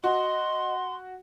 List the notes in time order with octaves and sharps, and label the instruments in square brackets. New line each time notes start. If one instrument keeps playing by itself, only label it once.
[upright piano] F#4 [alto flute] D#5 [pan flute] C6